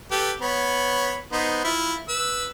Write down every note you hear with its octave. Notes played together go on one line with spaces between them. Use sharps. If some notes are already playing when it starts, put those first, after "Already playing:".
G4 A4 B4
B3 C#5 B5
B3 D#4 C5
E4 F4
B4 E6